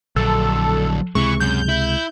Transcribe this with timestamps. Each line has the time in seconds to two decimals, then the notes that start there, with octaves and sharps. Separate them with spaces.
0.16 A#1 D3 F#3 A4
1.15 C#2 C3 E3 G#3 C#6
1.40 F#2 C#4 G6
1.68 E4